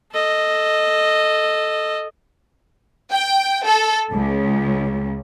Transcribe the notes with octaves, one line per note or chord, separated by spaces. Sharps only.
A4 D#5
G5
A4
C#2